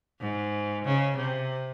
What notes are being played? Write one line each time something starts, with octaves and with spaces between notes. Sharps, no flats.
G#2
C#3
C3